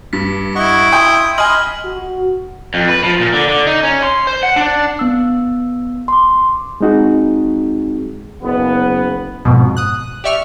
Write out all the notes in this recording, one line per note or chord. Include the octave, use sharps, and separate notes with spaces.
G2 B6
E4 D#5 F#5 C#6
G5 C6 D#6
D#5 G#5 B5 C6 F6 F#7
F#4
F2
B4
F3
A#2
D3
D3
D#4
C#4
C6
C5
F#5
D4
B3 E6
C6 D6
G#3 C4 D#4 F#4 G#4
F#1 B3
F2 G#2 B2
D#6 F#6
G4 D5 E5 C#6 F6